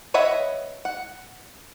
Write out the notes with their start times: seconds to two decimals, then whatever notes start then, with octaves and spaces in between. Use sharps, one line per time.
0.14 B4 C#5 D#5 E5 F#5
0.85 F#5